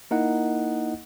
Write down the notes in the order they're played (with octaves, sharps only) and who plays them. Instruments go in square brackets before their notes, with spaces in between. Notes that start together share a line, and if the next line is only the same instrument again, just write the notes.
[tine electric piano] A#3 D#4 E4 A#4 D#5 F#5